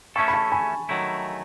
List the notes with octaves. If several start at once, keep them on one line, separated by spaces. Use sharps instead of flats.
A3 C#4 E4 A4 A5 C#6
B5
A5 C#6
G#5 B5
D#3 F#3 A3 E4